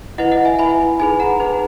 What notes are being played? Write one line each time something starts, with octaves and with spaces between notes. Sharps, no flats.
E4 B4 D#5 F#5
D#5 F#5
E5 G#5
E4 B4 G#5 B5
D#4 G#4 B4 G#5 B5
F#5 A#5
D#4 G#4 B4